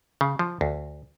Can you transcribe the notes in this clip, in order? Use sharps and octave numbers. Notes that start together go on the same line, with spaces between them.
C#3
F3
D2